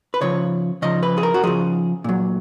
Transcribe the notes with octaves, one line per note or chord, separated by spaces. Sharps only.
B4
C#3 F3 C#5
C#3 F3 D#5
B4
G#4
A#4
F#4
C#3 F3 G#4
A#2 F#3